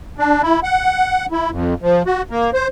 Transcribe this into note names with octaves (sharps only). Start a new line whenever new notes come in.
D4
E4
F#5
E4
F2
F3
F#4
A#3
C5